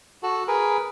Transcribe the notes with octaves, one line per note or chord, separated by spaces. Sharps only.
F#4 A4
G#4 A#4 B4